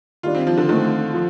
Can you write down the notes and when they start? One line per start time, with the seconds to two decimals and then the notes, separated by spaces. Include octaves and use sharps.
0.23 D#3 G3 D4 F4
0.35 C4
0.47 F3
0.58 D3
0.69 D3 D#3 A3 C4
1.14 F3